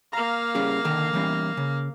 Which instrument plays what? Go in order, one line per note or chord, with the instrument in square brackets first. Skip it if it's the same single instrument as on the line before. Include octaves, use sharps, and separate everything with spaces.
[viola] A#3 F5 [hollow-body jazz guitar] A#5
[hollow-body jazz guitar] G3 C#4 G#4
D3 D#3 A4
E3 G3 C#4
C#3